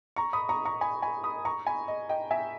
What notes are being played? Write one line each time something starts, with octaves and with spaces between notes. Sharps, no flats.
A#5 C#6
B5 D#6
A#5 C#6
A#5 C#6
G#5 B5
G#5 B5
B5 D#6
A#5 C#6
G#5 B5
D#5
D#5 G5
E5 G#5